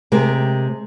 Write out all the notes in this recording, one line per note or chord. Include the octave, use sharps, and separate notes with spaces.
C3 G#3 G4 A#4